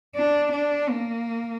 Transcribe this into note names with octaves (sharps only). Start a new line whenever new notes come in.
D4
D4
A#3